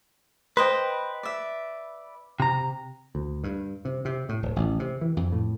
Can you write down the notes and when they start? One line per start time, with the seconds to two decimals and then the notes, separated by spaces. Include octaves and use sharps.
0.57 B4 C5 D#5 G5
1.23 D5 E5
2.40 C3 A#5
3.15 D2
3.44 G2
3.85 C3
4.05 C3
4.29 A2
4.42 D1
4.56 A1
4.80 C3
5.01 E3
5.17 F2
5.32 A2